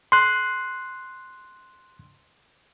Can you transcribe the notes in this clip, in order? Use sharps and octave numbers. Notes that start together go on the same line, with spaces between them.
C6 F#6